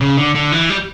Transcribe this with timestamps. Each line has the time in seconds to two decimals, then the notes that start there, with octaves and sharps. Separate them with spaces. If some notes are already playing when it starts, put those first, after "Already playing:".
0.01 C#3
0.17 D3
0.35 D3
0.52 E3
0.70 G3